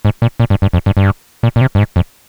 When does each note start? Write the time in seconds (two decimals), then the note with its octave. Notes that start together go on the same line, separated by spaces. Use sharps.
0.05 G#2
0.22 A#2
0.40 A#2
0.50 G2
0.62 G2
0.73 F2
0.86 G2
0.97 G2
1.43 A#2
1.56 A#2
1.61 C3
1.75 G2
1.78 G#2
1.96 F2